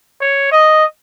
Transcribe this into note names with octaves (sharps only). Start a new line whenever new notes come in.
C#5
D#5